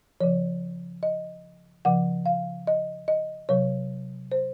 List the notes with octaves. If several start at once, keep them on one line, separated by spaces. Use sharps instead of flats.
C#3 F3 C#5
D#5
C#3 F3 F#5
F5
D#5
D#5
C3 F#3 C#5
C5